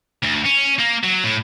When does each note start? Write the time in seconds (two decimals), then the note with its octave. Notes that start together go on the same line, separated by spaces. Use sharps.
0.23 D2
0.45 C#4
0.79 A#3
1.03 F#3
1.24 A2